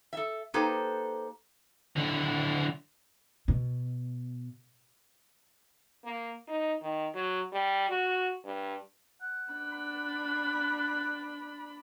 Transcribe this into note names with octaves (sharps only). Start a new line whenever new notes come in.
A4 E5
A#3 D#4 G4 A4 B4 C5
D3 E4
B2
A#3
D#4
D#3
F#3
G3
F#4
G2
F#5
D4 B5